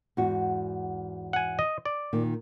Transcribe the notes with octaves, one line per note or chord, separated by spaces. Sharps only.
E2 G#2 F#4
F#5 G#5
D#5
D5
A#2 D#3